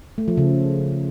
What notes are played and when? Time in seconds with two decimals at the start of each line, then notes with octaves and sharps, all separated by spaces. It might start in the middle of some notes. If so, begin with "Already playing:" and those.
0.18 A3
0.28 F3
0.38 C#3